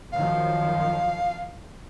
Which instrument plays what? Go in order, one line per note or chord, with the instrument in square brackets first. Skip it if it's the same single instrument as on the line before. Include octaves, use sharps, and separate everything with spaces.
[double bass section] F#2 D#3 F3 [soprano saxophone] F5